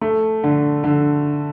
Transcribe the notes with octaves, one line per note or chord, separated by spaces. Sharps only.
A3
D3
D3